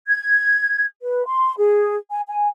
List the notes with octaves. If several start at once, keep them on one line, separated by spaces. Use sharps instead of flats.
G#6
B4
C6
G#4
G#5
G#5